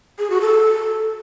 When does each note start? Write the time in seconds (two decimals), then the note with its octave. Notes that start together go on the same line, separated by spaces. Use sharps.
0.19 G#4
0.30 F#4
0.41 A4